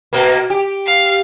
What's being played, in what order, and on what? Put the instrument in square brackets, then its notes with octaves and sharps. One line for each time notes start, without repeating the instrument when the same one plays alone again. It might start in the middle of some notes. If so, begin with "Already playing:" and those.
[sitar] B2 A#3
G4
[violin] F5